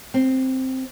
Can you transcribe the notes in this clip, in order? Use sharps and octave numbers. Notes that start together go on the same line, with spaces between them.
C4